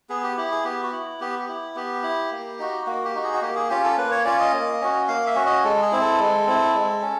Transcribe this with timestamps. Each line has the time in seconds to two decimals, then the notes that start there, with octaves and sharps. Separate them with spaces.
0.09 B3 G#4
0.23 G4
0.37 E4 G4
0.51 G#4
0.65 B3 G4
0.83 F#4
0.92 E4
1.20 B3 G4
1.39 G4
1.48 E4
1.75 B3 G4
2.03 E4
2.32 A#3
2.59 D#4 F#4
2.86 A#3 F#4
3.05 G4
3.15 D#4 F#4
3.23 G#4
3.33 F#4
3.42 A#3 G4
3.56 G#4
3.69 C#4 F4 G4
3.84 A4
3.97 A#3 B4
4.11 C#5
4.25 C#4 F4 D5
4.40 D#5
4.53 A#3
4.81 C#4 F#4
5.08 A#3 F5
5.27 E5
5.36 C#4 F#4
5.46 D#5
5.64 G#3 A4
5.82 G#4
5.92 C4 E4
6.01 A4
6.20 G#3
6.47 C4 E4
6.75 G#3
7.02 C#4